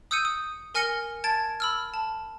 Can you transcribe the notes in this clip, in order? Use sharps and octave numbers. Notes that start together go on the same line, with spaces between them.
D#6 E6 G6 C#7 D#7
D#6
A#4 G#5 F6 A#6 C#7 G7
A5 G#6 A6 D7
B5 E6 F6
A5